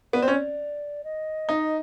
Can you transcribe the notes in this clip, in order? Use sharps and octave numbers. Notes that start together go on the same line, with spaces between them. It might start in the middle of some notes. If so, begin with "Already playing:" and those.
B3 D5
C4
C#4
D#5
D#4